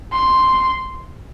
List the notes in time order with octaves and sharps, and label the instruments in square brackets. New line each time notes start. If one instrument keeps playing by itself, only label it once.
[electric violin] C6